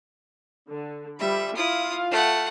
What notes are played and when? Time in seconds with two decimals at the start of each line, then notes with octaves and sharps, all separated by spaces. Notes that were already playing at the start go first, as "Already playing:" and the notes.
0.69 D3
1.20 F3 G3 E5 B5
1.56 E4 F4 F5 D#6
2.11 A3 F#5